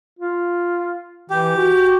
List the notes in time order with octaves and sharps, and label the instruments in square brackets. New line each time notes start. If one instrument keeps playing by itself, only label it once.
[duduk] F4
[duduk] E3 [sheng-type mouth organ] G4
[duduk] F#4